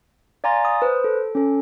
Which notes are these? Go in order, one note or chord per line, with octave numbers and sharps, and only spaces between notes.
D5 F5 G#5 A#5 C6 A6
D#6
B4 C5
A4
C#4 A4